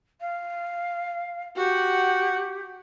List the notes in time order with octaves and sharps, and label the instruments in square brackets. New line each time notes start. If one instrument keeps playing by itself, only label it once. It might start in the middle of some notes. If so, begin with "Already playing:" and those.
[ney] F5
[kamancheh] F#4 F#5 [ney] G4